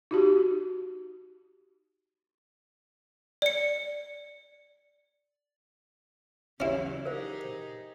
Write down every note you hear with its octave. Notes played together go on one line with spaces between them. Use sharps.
D#4 F#4 G4
D5 C#7
C#3 E3 F#3 C#4 E4 F4 G4 D5
D#4 G4 G#4 A#4 C5